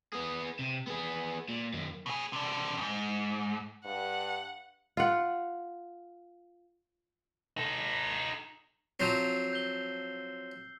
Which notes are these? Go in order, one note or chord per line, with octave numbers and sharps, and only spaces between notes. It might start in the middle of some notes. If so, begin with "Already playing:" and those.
B3 G#4
C3
B3 G#4
A#2
F#2 D#3
B2 G#4
C3 D4
F2 G#2
G2 F#5
F4 F#5
D#4 A4
F3 F#3 C4 E6 G6 C7
G6 G7